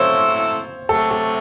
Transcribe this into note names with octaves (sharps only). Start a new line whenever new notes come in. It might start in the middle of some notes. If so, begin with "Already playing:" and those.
Already playing: A2 F#3 C4 E4 A4 C5 C#5
C3 F#3 A3 A4
A4